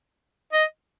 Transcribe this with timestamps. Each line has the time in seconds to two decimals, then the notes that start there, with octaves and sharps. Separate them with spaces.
0.53 D#5